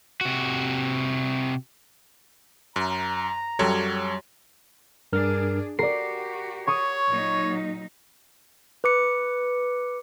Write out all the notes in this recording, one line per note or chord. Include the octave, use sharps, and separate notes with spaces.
C3 F#4
F#2 A#5
F#2 F#3 G3 G4 A4 C#5
G2 D4 G#4 A#4 F6
F#4 G4 A#4 D5 C7
C#5 C#6 D#6
A#2 F#3 D#4
B4 D6 C#7